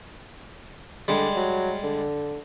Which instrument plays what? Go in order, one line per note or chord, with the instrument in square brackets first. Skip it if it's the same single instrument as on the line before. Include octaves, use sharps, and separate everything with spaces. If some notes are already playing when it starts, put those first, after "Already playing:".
[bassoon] D3 [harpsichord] G3 G#3
[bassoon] F#3
D3